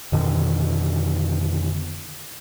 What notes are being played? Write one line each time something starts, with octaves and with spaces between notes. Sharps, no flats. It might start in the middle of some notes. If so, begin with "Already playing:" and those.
F2 B2 D3 D#3